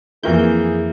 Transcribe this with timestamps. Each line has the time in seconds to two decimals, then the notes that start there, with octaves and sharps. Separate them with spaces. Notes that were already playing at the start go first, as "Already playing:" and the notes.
0.23 F2 E3 A#3 E4 G#4 G6